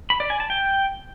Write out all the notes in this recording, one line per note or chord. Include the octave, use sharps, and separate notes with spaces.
B5
D5
G#5
A5
G5